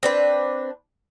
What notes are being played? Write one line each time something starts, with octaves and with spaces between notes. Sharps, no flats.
C4 D4 B4